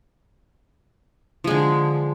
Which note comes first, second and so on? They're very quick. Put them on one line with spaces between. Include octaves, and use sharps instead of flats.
F3 G#3 D3